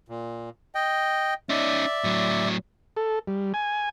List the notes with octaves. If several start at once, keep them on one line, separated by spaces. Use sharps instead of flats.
A#2
D#5 G5
C#4 D#4 D5 E5
A2 F#3
A4
G3
G#5